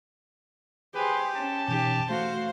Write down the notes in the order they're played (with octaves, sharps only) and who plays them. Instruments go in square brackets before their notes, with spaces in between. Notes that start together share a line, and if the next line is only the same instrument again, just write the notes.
[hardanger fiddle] G4 [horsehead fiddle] G#4 C5 [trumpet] B4
[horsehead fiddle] C#4 [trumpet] A5
[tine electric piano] B2 E3 D#4 [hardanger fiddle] G4
[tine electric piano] A3 [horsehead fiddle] F#4 F5 [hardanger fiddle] C5